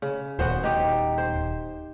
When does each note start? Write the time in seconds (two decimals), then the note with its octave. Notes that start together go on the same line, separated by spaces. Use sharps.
0.02 C#3
0.39 D#1 B3 F#4 C5
0.64 D#4 G4
1.18 C5